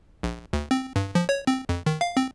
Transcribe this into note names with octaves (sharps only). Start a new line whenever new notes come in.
A#1
D2
C4
G2
F3
C#5
C4
F2
D#3
F5
C4